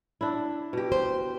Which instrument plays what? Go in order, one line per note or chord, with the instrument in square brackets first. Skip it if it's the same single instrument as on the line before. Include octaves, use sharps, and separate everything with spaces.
[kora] D4 E4
B2 G4
[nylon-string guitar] C5